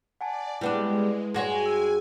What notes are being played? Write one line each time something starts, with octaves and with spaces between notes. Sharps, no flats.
D5 F#5 G#5 A5
G3 G#3 B3 D4 E4 B4 F#5
G2 G#3 F#4 C#5 G#5
E6